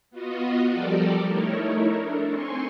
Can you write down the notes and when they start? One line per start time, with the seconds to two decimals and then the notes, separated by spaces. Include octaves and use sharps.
0.11 B3 F4 F#4 D#5
0.71 F3 G3 G4 A4 A#4 D5
1.25 A3 D#4 E4 A#4 C#5
1.90 D4 A4 A#4
2.28 C4 G#5 C6 C#6